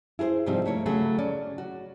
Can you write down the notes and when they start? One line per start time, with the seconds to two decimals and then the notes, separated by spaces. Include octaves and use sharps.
0.19 E4 G#4 A#4 C5
0.46 G#2 C3 F3 G3 C4 D#4
0.66 A3 A#3 C#5
0.86 C#3 F#3 A3 G#4
1.19 C#4 D5
1.58 F#4